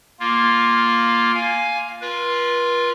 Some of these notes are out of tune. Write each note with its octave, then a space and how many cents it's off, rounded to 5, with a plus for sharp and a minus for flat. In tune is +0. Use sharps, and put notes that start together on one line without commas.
A#3 +5 F4 +0
F5 +0 G#5 +5
F4 +0 B4 -40